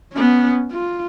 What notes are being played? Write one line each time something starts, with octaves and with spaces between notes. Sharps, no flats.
B3 C#4
F4